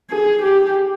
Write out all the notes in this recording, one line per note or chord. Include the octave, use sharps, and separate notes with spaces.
G#4
G4